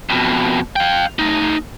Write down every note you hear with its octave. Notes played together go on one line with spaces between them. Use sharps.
F2 B2
F5 G5
A3 D#4